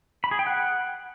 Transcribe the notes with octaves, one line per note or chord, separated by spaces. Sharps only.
B5
G#4
G5
F#5